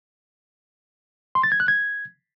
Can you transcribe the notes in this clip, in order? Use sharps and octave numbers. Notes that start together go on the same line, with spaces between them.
C6
A6
G#6
F#6
G#6